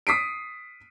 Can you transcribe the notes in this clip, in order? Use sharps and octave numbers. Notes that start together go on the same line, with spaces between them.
D#6 B6 C7 D7